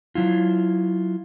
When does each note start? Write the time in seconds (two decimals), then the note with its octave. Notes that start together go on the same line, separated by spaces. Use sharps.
0.15 F#3 E4 F4